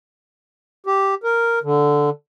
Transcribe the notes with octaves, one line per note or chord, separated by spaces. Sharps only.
G4
A#4
D3